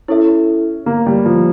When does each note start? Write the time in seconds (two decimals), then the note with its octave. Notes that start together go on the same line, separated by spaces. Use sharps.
0.08 C#4 E4 A4 E5
0.86 A#3
1.06 G3
1.25 F3